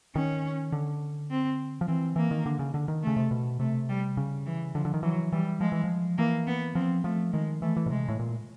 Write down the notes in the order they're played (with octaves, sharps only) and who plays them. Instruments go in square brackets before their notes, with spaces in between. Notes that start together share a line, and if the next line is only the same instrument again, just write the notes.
[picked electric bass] D#3 [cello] C#4
[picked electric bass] D3
[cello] C4
[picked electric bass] F3
[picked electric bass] E3 [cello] C4
[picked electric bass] E3 [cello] A#3
[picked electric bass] D#3
D3
C#3
D3
D#3
[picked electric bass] C#3 [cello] A3
[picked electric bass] C3
B2
[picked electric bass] C3 [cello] A3
[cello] G3
[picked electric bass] C#3
[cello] E3
[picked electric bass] D3 [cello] F3
[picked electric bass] D3
D#3
[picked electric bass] E3 [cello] F#3
[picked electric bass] E3 [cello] G3
[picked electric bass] F3 [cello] G#3
[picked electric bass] E3
F3
[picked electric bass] E3 [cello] A#3
[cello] B3
[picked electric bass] F3 [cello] C4
[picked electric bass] F3 [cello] A3
[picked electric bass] D#3 [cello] G#3
[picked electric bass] E3 [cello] A3
[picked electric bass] E3
B2
[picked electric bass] C3 [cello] G#3
[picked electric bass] A2
A#2